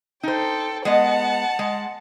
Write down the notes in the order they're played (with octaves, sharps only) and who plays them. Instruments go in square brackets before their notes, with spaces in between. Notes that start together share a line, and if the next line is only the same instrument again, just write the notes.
[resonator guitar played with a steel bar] D#4 C5 [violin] A4 G5
[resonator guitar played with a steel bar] G#3 B3 D#5 [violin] F#5 A5
[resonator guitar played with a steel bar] G#3